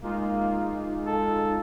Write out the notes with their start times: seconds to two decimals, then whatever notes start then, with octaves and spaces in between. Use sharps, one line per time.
0.03 G#3 A#3 D#4 F4
1.07 A4